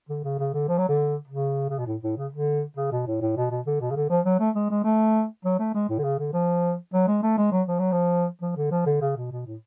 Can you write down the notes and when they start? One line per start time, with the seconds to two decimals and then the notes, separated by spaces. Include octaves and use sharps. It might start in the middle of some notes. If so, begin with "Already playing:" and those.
0.09 D3
0.24 C#3
0.39 C#3
0.54 D3
0.68 F3
0.78 F#3
0.88 D3
1.28 C#3
1.69 C#3
1.78 B2
1.86 A2
2.03 A2
2.17 C#3
2.32 D3
2.77 C#3
2.91 B2
3.07 A2
3.21 A2
3.36 B2
3.50 B2
3.66 D3
3.80 B2
3.91 C#3
3.96 D3
4.10 F3
4.25 F#3
4.39 A3
4.55 G#3
4.70 G#3
4.84 A3
5.45 F#3
5.59 A3
5.74 G#3
5.89 A2
5.98 D3
6.04 C#3
6.19 D3
6.33 F3
6.93 F#3
7.08 G#3
7.22 A3
7.37 G#3
7.52 F#3
7.67 F3
7.79 F#3
7.92 F3
8.42 F3
8.56 D3
8.71 F3
8.86 D3
9.01 C#3
9.16 B2
9.31 B2
9.46 A2